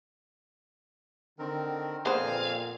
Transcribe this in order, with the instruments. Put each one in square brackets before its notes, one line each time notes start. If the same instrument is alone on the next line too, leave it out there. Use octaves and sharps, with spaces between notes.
[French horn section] D3 [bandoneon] D#3 C4 A#4
[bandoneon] F2 C4 G#5 [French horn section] A#2 [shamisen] B3 C5 [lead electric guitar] F5